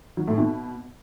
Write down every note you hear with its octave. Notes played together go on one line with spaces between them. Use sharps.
F#3
A2
B2